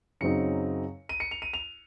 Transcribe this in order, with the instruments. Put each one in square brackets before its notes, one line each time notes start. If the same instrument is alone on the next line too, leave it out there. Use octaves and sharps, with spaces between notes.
[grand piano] F#2 C#3 F#3 C4 D#4 C#7
D#7
C#7
F7
D#7
F7